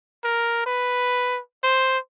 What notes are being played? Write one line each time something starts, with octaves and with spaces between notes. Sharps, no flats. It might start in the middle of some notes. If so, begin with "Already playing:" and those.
A#4
B4
C5